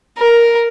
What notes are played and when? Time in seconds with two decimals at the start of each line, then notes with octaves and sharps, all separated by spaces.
0.19 A#4